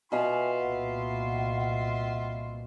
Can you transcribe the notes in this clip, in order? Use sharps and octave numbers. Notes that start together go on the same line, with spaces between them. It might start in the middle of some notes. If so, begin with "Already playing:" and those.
B2 F4 E5 F5 G#5 B5 C6
C2 A#2 F#5